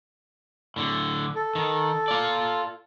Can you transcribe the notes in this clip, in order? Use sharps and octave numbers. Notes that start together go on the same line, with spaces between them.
A2 D3
A4
D#3
F4 D5